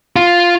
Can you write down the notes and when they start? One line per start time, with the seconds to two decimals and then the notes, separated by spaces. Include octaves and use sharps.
0.16 F4